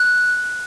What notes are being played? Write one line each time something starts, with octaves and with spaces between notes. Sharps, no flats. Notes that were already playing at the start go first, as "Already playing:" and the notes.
Already playing: F#6